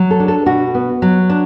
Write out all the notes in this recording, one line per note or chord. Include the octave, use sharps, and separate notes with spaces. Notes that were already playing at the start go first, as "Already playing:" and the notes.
Already playing: F#3
A4
D4
A4
B2 F#4
B3
F#3
D4